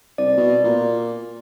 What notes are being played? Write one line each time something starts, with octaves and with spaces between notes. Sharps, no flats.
C2 D5
B2
A#2